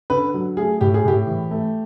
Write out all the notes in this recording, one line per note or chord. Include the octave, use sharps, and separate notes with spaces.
D3 B4
F#3
A3 G#4
A2 G4
G#4
A2 G4
E3
A3